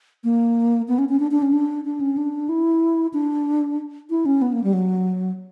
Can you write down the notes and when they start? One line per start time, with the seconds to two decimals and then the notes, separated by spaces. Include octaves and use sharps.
0.24 A#3
0.88 B3
0.98 C#4
1.09 C#4
1.20 D4
1.31 D4
1.42 C#4
1.53 D4
1.85 D4
2.00 C#4
2.17 D4
2.49 E4
3.13 D4
4.10 E4
4.26 C#4
4.42 B3
4.53 A#3
4.64 G3
4.73 F#3